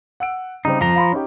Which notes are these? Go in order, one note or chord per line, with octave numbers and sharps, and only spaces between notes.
F#5 E6 D7
C#3 G3 C4 D#4
F2 F3 A#5 G7
F5 B5 C6
C#4 D#4 G4